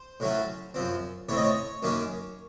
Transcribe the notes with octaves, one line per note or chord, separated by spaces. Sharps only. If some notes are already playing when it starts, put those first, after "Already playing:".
Already playing: C5
A2 F#3 A3 C#4
F#2 F3 C4
A2 A3 C4 C#5
D#5
C#5
F#2 D#3 A#3 C#4